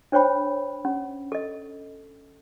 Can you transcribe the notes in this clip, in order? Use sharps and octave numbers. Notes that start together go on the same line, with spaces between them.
D4 C5 C#5 G5 B5
C#4
A4 D#5